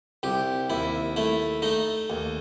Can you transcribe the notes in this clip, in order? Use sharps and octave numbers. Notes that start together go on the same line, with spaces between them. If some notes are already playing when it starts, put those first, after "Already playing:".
C2 G4
D#2 E4
A3 E4
A3 D#4
D#2